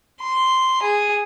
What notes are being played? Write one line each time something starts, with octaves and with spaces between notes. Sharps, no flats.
C6
G#4